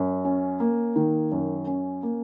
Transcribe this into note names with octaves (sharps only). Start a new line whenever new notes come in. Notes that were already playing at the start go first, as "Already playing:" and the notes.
Already playing: F#2
C#4
A#3
D#3
F#2
C#4
A#3